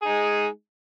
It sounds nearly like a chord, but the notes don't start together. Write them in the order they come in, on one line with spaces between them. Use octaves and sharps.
G#4 D#4 G#3